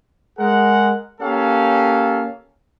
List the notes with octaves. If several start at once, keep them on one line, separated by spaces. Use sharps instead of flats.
G#3 G#4 A#4 F#5
A#3 C#4 G4 A4 F5